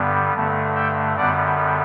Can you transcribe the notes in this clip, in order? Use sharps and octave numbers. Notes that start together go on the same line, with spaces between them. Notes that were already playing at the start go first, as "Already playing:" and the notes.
Already playing: G2 D3 G3 B3
G2 D3 A3
E5 G5
F#2 D3 G3 B3 D5 F#5